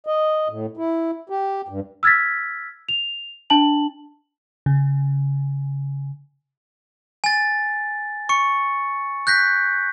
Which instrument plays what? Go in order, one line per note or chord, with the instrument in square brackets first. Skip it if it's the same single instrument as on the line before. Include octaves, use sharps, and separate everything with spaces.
[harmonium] D#5
A2
E4
G4
G2
[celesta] E6 F6 G#6 A6 B6
F7
D4 A5 F#7
[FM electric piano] C#3
[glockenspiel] G#5 A6
C#6 C#7
F#6 G6 A#6 B6